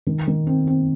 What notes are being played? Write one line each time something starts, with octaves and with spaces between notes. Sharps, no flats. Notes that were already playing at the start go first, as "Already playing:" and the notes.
D#3
D#3
C4
C4